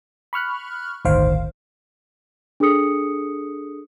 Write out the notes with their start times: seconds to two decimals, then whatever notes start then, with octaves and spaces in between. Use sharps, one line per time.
0.33 B5 C#6 F6 F#6
1.05 G1 D2 A2 D#3 C5 F5
2.60 D4 G#4 A4 D#6 C#7